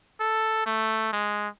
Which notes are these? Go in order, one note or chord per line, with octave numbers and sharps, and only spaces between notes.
A4
A3
G#3